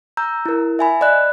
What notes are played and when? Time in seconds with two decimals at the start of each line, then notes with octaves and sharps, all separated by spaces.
0.17 A#5 E6 G6
0.46 E4 A#4
0.79 E5 G#5 B5
1.01 D5 D#5 B5 F#6